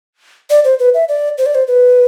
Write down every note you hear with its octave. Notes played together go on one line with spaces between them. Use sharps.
D5
C5
B4
E5
D5
C5
D5
C5
B4